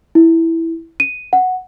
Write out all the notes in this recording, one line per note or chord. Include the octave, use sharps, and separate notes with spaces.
E4
D#7
F#5